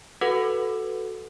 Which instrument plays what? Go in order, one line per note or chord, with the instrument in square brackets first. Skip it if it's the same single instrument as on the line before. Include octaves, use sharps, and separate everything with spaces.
[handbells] F#4 A4 B4 F#5